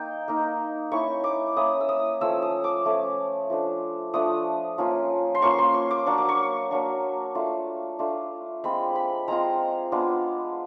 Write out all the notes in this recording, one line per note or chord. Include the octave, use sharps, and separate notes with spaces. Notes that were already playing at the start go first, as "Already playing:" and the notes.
Already playing: A#3 D#4 G5
A#3 D#4
A#3 C#4 E4 C#6
D6
A#3 C#4 E4 D#6
E6
D#6
F3 A3 C#4 E6
D#6
D6
F3 A3 C#4
F3 A3 D4
F3 A3 D4 D#6
F3 A#3 C#4 F4
C6
F3 A#3 C#4 F4 C#6
C6
C#6
D6
F#3 A#3 D4 C#6
D6
C#6
F#3 A#3 D4
A3 D4 F4
A3 D4 F4
G#3 C4 F4 B5
B5
G#3 C4 F4 A#5
G#3 B3 D4 F4